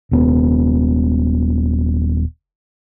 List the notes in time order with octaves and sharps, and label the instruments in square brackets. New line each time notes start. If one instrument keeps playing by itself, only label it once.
[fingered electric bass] D#1 B3